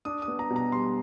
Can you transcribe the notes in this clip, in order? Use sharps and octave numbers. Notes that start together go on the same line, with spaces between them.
D4 D#6
D#6
B3
A#5
B2
A#5
G3 C6